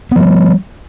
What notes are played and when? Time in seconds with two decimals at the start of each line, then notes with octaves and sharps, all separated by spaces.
0.11 B3
0.16 F3
0.20 G3